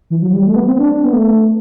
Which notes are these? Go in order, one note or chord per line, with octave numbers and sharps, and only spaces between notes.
E3
F#3
G3
A3
B3
C4
D4
B3
A3